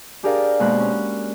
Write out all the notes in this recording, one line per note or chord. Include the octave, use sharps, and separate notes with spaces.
D4 G4 G#4 A#4 D5 F5
B2 G#3 A#3 C5 B5 F#6
C#4